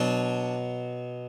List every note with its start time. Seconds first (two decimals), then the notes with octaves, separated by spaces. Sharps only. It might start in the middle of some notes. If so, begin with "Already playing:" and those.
Already playing: B2 F#3 D4